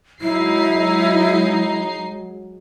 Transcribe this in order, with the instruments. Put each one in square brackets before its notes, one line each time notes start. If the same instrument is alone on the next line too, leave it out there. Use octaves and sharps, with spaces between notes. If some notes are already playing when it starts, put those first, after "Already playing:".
[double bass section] F#3 G#3 [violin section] D#4 C7 [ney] E4